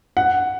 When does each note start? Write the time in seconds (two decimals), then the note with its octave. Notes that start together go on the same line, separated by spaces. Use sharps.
0.17 F#5